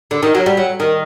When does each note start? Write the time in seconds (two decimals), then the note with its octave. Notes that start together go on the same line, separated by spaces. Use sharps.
0.11 D3
0.23 D#3
0.35 F#3
0.46 G3
0.57 F#3
0.80 D#3